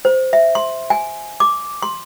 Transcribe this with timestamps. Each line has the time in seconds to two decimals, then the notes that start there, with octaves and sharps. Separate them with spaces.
0.05 C5
0.33 E5
0.55 C6
0.90 G#5
1.40 D6
1.82 C6